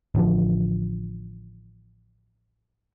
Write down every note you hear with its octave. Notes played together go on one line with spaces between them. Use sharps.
A1 D3 F3